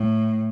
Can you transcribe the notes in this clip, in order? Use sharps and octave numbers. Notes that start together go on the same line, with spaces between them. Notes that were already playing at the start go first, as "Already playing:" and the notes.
Already playing: A2